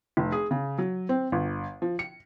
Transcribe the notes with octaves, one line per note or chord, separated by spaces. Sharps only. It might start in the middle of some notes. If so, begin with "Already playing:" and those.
F1
G#4
C#3
F#3
C4
G1
F3
C#7